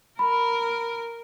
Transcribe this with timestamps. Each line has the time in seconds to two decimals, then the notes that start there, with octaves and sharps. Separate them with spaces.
0.19 A#4 B5